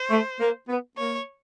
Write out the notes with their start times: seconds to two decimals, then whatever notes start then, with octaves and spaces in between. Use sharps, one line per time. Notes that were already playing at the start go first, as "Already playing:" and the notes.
Already playing: C5
0.10 A3
0.40 A#3
0.69 B3
0.98 A#3 C#5